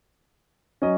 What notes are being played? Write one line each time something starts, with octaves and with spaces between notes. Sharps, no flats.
F#3 C#4 D#5